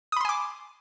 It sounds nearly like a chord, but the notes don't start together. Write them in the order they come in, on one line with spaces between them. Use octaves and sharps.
D#6 B5 C6 G#5 D6